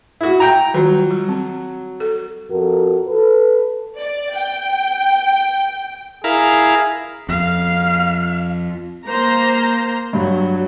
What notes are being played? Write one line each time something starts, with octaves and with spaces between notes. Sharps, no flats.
E4 F#4
G5 A#5
D#3 F#3 G3 F4
G3
C4
A4
F2 F#4 A4 A#4
A4 B4
D5
G5
E4 G#4 A#4 F5
F2 F5
A#3 C5 A#5
G2 F#3